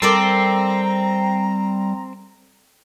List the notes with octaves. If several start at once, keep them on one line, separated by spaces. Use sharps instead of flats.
G3 C4 A4 A#4 D5 A#5